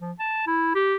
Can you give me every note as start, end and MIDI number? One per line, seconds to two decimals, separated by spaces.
0.01 0.12 53
0.19 0.42 81
0.47 0.72 64
0.75 0.97 67